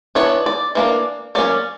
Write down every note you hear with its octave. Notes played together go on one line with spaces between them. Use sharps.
E3 B3 D4 C#5
D5
E3 A#3 D4
F#3 A#3 C#4 D5